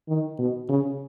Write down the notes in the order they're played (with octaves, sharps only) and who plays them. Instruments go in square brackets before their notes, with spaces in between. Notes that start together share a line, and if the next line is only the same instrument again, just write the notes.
[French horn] D#3
B2
C#3